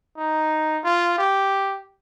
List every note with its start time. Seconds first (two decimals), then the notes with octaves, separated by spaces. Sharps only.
0.17 D#4
0.84 F4
1.18 G4